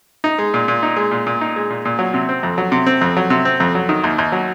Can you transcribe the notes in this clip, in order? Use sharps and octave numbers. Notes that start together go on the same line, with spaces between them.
D#4
G#3
A#2
A#2
D#4
G#3
A#2
A#2
D#4
G#3
A#2
A#2
F#3
C3
C4
F2
F#3
C3
C4
F2
F#3
C3
C4
F2
F#3
D#3
D#2
D#2
F#3